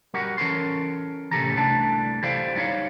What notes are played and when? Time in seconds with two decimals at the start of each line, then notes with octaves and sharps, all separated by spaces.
0.14 G3 F#4 G4 A#4 F#5
0.38 E3 C#4 A4 A#4 C6
1.31 A2 C3 C#4 G4 A4 A#5
1.55 C2 E3 A3 D4 A5
2.23 E4 G4 A4 C5 D5 F5
2.55 G3 B3 D#4 C#5 F5